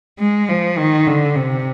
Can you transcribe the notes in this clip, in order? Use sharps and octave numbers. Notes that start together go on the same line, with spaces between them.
G#3
F3
D#3
D3
C3